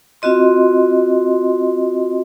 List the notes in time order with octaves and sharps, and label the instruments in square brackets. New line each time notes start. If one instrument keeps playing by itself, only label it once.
[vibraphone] C4 F4 F#4 D#5 C6